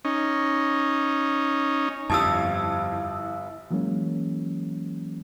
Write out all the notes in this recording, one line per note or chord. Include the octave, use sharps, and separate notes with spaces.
C#4 D#4
G1 F2 G3 E4 F5 A5 D#6 E6
E3 F#3 G#3 A#3 C#4